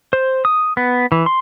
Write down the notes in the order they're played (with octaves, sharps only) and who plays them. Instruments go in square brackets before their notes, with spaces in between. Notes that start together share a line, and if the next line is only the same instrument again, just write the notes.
[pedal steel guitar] C5
D#6
B3
E3
C6